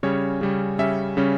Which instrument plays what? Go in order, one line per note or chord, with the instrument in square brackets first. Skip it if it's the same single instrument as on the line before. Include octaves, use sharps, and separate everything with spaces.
[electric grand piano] C#3 G3 C#4 C#5
C#3 G3 C#4
C#3 G3 C#4 E5
C#3 G3 C#4